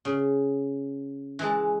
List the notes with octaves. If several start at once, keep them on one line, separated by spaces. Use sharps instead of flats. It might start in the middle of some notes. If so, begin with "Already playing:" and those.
C#3
E3 G#3 A5